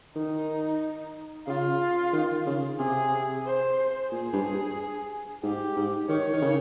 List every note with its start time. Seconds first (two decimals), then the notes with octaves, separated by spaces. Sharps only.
0.15 D#3 D#4
1.47 C#3 F4
2.13 D#3
2.47 C#3
2.79 C3 G#4
3.46 C5
4.11 A#2 G#4
4.33 G2
5.43 G#2 G4
5.76 G#2
6.09 D#3 C#5
6.33 D#3
6.42 C#3